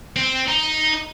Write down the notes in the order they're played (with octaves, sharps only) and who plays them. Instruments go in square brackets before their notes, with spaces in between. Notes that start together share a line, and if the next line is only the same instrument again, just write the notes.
[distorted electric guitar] C4
D#4